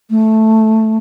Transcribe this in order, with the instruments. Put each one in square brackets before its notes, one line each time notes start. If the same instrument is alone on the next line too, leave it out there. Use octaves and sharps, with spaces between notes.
[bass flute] A3